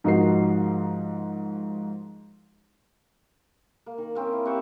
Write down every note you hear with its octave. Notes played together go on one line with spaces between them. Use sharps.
G#2 F3 D#4 F#4 A#4 C7
A#3
D#3
A#3 C4 C#4
E4
C4 G4 F#5 C#6